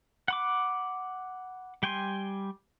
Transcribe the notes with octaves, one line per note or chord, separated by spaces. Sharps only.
F#5 B5 D6
G3 G5 G#5 C6